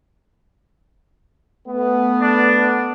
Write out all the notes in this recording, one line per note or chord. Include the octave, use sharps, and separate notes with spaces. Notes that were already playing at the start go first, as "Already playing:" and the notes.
A3 B3
D4